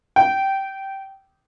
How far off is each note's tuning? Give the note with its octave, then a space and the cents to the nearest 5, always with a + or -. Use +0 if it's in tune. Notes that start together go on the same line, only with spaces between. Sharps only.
G5 -15